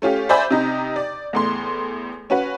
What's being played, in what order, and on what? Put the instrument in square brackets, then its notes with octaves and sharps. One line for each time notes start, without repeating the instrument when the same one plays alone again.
[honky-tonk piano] A3 C#4 F4 G4
C5 D5 E5 G#5 B5 G6
C3 D#4
D5
E2 A2 C6
C#4 F#4 B4